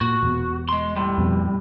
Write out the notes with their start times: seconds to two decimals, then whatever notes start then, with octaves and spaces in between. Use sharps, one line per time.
0.01 A#2 F#4
0.23 E1 B2
0.69 G#3 C6
0.96 A2 G3
1.18 F2 B2